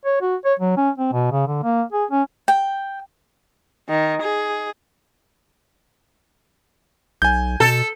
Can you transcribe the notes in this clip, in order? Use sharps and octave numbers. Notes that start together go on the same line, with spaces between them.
C#5
F#4
C#5
F#3
C#4
C4
B2
C#3
D3
A#3
G#4
C#4
G5
D#3
G#4
B1 G#5 G6
B2 A4